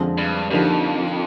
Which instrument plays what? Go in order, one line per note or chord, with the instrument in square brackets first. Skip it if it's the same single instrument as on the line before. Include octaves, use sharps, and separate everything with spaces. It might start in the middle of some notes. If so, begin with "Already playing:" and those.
Already playing: [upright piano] F2 D3 F3 G#3 C4
[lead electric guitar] G2
[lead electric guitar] F2 [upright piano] D3 F3 A#3 D#4 G4